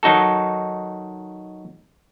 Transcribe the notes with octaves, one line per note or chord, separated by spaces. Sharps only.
D#3 F#3 D#4 F#4 A4